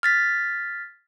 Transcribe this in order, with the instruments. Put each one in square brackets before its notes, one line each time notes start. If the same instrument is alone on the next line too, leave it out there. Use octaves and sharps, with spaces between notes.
[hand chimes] F6 A6 B6